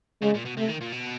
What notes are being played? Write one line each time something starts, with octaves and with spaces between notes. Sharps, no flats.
C#3 G#3
A#2
B2
C3 A3
D#3
A#2
B2